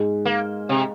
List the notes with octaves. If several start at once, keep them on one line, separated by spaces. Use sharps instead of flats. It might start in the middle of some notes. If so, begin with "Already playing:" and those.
Already playing: G#2 G#3
A#3
C3